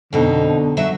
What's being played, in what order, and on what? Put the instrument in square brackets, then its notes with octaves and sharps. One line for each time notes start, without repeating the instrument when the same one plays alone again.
[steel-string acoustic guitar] F2 B2 D#4 [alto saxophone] D3
[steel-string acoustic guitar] F#3 F#4 E5